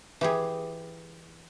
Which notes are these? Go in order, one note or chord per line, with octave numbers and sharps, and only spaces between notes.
E3 G4 G#4